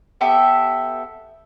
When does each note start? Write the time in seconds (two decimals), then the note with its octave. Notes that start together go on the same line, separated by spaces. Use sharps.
0.21 B3 G4 A4 E5